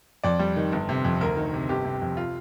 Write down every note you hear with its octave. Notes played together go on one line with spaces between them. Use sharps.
F2 D5
G3
D#3
G1
C3
F2
D2 A#4
D#3
C3
G1 G4
C3
F2
F4